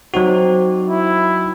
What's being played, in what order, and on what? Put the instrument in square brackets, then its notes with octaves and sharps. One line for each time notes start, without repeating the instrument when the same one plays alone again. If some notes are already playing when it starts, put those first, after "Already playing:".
[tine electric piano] F#3 D#4 F#4 [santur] C4 D5
[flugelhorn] E4